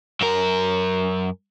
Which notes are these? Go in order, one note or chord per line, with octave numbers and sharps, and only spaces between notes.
F#2 A#4